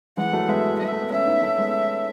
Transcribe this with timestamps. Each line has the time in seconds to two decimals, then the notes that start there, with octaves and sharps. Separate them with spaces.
0.17 E3 G#3 F#5
0.33 F#3 A3
0.48 G#3 B3 E5
0.79 G#3 E5
0.92 A3
1.02 B3
1.11 A3 C#4 E5
1.27 B3 D#4
1.42 A3 C#4
1.58 G#3 B3